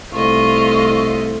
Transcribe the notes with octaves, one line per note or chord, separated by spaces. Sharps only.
C2 A3 F4 D#5 C#6